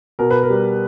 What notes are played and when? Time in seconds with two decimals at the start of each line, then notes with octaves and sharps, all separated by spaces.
0.19 B2 A#4
0.31 B4
0.43 A#4
0.50 G3